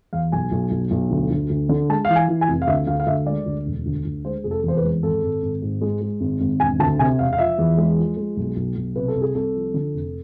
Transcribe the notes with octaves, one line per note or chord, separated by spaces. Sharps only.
E2 F5
B1 G#5
B1
B1
B1
D2
D2
D2
D3
G#3 A5
E3 F5
G#5
E3
G#5
F1
F5
D2 E5
D2 F5
F5
D2 E5
G#3 D5
D2
E1
D2
D2
G#3 C5
F1 G#4
A4
E2 C5
B4
G#3
G#1 A4
G#1
G#1
G#2
G#3
G#3
G#1
G#1
E1 G#5
D2 A5
C3 G#5
E1 F5
F5
F3 E5
E2
G#3
F3
G#3
B1
B1
B1
C3 B4
A4
C2
G#4
C2 A4
F3
D3
F1